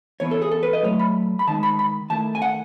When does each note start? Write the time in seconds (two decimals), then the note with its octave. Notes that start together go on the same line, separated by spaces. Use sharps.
0.20 E3 B3 E4 C#5
0.31 A4
0.42 G#4
0.51 A4
0.63 B4
0.73 D#5
0.83 F#3 A3 E4 C#5
0.99 B5
1.39 B5
1.47 D#3 G#3 D#4 A5
1.63 B5
1.79 B5
2.10 D#3 A3 E4 A5
2.35 G#5
2.42 F#5